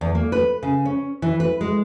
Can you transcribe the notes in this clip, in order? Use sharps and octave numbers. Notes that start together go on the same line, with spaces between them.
E2
A#3
B4
C#3
C#4
E3
B4
G#3